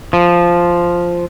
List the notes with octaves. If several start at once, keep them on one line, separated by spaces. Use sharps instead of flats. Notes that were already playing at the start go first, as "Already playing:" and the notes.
F3